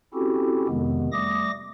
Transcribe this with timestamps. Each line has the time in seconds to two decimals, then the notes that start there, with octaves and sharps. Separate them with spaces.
0.14 C4 C#4 E4 F#4 G4 A4
0.68 F2 C3 D#3 G#3 B3
1.12 G3 A3 D6 D#6 A#6